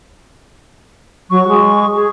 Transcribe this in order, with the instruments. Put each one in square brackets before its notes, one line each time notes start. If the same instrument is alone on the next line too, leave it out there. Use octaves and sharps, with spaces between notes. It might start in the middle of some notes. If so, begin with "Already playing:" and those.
[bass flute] F#3 [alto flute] C#6
[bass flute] G#3
[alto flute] G#4